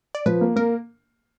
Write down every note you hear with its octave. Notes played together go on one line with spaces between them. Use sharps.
D5
F3 B4
A#3
A#3 A#4